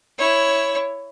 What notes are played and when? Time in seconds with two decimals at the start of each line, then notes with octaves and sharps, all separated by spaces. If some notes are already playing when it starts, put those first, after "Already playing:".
0.18 E4 C#5